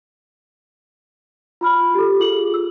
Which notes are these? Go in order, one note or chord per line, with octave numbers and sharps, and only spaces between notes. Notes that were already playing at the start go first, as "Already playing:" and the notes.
F4 B5 F6
G4 A4
F4 G#4 F#7
E6